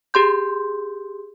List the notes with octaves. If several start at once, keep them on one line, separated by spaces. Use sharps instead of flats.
G4 G#4 C6 G6